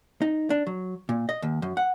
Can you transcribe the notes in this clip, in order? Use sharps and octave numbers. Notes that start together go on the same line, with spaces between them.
D#4
D4
F#3
A#2
D#5
D#2
F#2
F#5